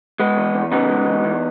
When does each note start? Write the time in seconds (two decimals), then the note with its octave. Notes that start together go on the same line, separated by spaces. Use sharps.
0.20 G#3 B3
0.37 E2
0.54 E2
0.71 C#3 B3 D#4
0.89 G#3
1.06 E2
1.24 E2